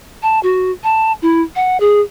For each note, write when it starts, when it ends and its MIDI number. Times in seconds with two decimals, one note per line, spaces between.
0.22 0.39 81
0.43 0.72 66
0.83 1.12 81
1.22 1.42 64
1.55 1.79 78
1.80 2.01 68